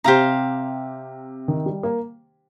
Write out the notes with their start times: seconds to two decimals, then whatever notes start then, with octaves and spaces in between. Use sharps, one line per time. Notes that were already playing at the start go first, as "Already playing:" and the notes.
0.04 C3 G4 C5 F5 A#5
1.48 D#3
1.66 G3
1.83 A#3